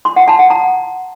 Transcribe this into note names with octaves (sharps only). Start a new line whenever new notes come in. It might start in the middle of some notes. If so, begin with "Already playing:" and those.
C6
F#5
A5
F#5
A#5